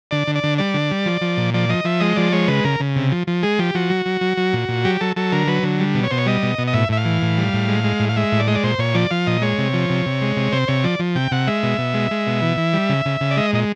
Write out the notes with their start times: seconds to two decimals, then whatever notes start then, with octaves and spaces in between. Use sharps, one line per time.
0.11 D3 D5
0.27 D3
0.35 D5
0.43 D3
0.58 G3 D5
0.74 D3
0.91 G3
1.06 F3
1.21 F3
1.37 A#2
1.54 F3 D5
1.69 F3 D#5
1.84 F3 E5
2.00 G#3 D#5
2.16 F3 D5
2.32 G#3 C#5
2.48 C#3 B4
2.64 C#3 A#4
2.80 C#3
2.96 C3
3.12 F3
3.27 F3
3.43 G#3 G#4
3.59 F3 G4
3.75 F3 F#4
3.90 F#3
4.06 F#3
4.21 F#3
4.37 F#3
4.53 A#2
4.69 A#2
4.85 F#3 G4
5.01 F#3 A4
5.16 F#3 A4
5.32 D3 A#4
5.47 F#3 B4
5.63 D3
5.80 G3
5.95 B2
6.03 C#5
6.11 B2 C5
6.18 C#5
6.26 G3 D#5
6.43 B2
6.58 B2
6.67 D#5
6.73 A2 E5
6.89 A2 E5
6.97 F5
7.05 E3
7.22 A2
7.38 G3
7.54 A2
7.68 G#3
7.84 G#3
8.00 A2
8.09 F5
8.16 G#3 E5
8.32 A2
8.40 D5
8.47 G#3 D#5
8.55 D5
8.63 A#2 C5
8.79 A#2 C#5
8.94 F3 D5
9.11 F3 F5
9.27 A#2 D#5
9.42 G#3 C#5
9.58 C3
9.73 F3
9.89 C3
10.06 C3
10.22 G#3
10.36 C3
10.52 C3 C5
10.68 C3 C#5
10.84 F3 D5
10.99 F3
11.15 C3 G5
11.31 C3 F#5
11.47 G#3 E5
11.63 B2
11.78 B2
11.94 G#3
12.11 G#3
12.27 B2
12.42 E3
12.57 E3
12.73 G3
12.89 C#3
13.06 C#3
13.21 C#3
13.31 D5
13.37 G#3 D#5
13.53 A#2 D#5